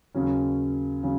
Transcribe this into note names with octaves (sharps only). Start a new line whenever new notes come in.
D#2 C#3 F#3 C#4
C#3 F#3 C#4